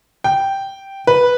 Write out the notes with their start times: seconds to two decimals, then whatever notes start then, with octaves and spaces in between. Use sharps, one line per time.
0.24 G5
1.07 B4